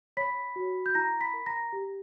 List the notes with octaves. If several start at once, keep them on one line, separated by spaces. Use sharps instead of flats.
C#5 B5 B6
F#4
G6
E4 A#5 A#6
B5 B6
A#4
A#5 A#6
G4